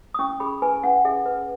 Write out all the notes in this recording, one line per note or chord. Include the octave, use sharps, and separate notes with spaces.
D#6
C#4 C#6
G#4 B5
B4 G#5
C#4 F#5
G#4 E5
B4